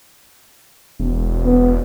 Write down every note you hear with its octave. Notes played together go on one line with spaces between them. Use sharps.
E1
B3